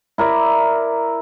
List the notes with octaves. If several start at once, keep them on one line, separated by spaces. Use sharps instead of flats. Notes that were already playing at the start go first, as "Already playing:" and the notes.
E4 A#4 D5 E5